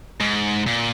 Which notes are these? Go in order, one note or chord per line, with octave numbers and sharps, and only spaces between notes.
G#2
A#2